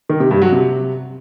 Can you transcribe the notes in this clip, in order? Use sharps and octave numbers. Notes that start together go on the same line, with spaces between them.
D#3
C3
G2
F#3
C3